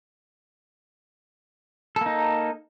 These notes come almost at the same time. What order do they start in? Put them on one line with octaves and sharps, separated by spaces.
A4 A#3 D#4